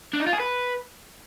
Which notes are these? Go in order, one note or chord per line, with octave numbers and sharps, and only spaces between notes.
D4
D#4
F4
G#4
B4